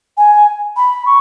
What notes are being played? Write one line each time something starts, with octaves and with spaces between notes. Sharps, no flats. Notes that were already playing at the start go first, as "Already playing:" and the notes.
G#5
B5
C#6